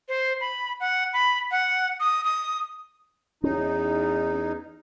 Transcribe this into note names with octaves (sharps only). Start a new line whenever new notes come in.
C5
B5
F#5
B5
F#5
D#6
D#6
E2 C#4 D#4